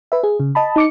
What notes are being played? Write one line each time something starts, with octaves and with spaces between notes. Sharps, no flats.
B4 E5
G#4
C#3
D#5 A5 B5
D#4 D6 C#7